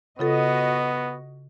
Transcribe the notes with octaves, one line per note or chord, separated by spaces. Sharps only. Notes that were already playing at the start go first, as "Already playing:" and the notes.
C#3 B3 F4 F#4 A4 D#5